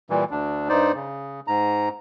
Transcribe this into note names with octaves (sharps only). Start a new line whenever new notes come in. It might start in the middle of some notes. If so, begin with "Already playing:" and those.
A#2 E3 G3
D2 D4
G2 D#4 C5 D5
C#3
G#2 A#5